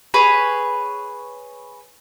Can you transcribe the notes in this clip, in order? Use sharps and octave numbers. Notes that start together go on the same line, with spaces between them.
G#4 B4 C#5 B5